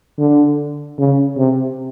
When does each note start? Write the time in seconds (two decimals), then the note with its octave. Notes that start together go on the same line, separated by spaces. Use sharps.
0.18 D3
0.98 C#3
1.37 C3